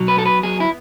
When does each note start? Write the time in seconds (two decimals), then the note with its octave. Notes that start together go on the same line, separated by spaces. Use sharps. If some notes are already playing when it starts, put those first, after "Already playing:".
Already playing: B2 F#3
0.08 B4
0.17 B3 A4
0.26 B4
0.43 F#3 G#4
0.60 E4